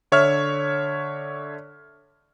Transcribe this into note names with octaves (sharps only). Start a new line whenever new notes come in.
D3 C#5 E5 F6